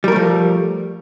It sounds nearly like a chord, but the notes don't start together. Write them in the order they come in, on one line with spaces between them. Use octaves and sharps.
G3 A#4 A3 F3